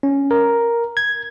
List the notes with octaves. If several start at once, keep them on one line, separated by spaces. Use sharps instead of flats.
C#4
A#4
G#6